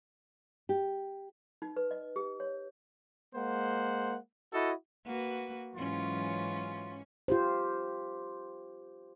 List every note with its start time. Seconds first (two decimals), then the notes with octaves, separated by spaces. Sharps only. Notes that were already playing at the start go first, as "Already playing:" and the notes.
0.69 G4
1.62 D#4
1.76 B4
1.91 D#5
2.16 G4
2.40 C#5
3.35 G#3 A#3 C5 F#5
4.53 E4 F#4 A4 D#5
5.05 A#3 F#4 B4
5.75 G#2 E3 F#3 C#4 F4
7.28 F4 G4 C5